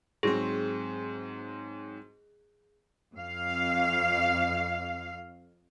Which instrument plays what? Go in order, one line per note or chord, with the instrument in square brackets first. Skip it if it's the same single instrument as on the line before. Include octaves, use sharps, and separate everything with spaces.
[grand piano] G#2 F#3 C4 [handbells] G#4
[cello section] F2 F5